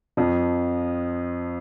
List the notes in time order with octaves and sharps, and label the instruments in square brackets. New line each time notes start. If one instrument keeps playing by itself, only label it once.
[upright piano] F2 F3